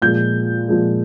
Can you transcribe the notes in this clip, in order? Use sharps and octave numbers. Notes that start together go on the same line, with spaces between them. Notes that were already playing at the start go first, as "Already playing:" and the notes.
A#2 F3 G#3 G6
A#2 F3 G#3